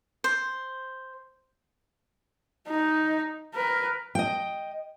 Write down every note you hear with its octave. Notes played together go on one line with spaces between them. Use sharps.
C5
D#4
A#4 B4
D#5 G5